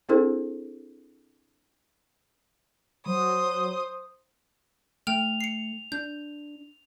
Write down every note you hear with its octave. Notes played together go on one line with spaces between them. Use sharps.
C4 D4 E4 G#4 A4 C5
F#3 C5 D#6
A3 G5 F6 F7
C7 C#7
D4 G6